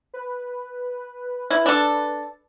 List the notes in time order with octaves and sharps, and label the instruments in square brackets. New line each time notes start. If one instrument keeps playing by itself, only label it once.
[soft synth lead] B4
[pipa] E4
D4 A4